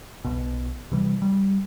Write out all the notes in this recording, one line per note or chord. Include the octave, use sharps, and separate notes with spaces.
B1 B2
C3 E3 G3
G3